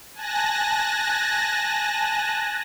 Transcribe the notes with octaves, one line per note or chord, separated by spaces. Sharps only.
G#5 A5 F#6 A#6